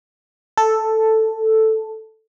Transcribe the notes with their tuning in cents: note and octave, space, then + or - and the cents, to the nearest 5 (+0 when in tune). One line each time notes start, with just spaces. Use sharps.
A4 +5